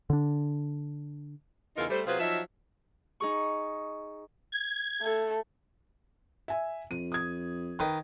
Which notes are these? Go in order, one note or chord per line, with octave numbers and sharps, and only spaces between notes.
D3 D4
E2 C#3 D#4 F4 A4 A#4
G3 A3 C5
C3 F#3 F4 G#4 B4 C5
F3 F#3 D#4 E5
D#4 G#4 C#6
G#6
A3 A4
E5 G#5
F2 D#7
D#6 G#6
D#3 B4